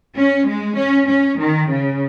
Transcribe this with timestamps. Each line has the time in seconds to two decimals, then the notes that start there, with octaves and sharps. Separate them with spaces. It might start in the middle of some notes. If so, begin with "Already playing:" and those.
0.17 C#4
0.48 G#3
0.78 C#4
1.08 C#4
1.39 D#3
1.69 C#3